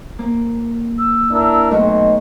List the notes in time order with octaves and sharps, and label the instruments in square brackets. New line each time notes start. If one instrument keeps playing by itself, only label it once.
[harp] A#3
[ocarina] E6
[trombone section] D4 E4 A#4
[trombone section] B1 [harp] A3 F#4 [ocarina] D#5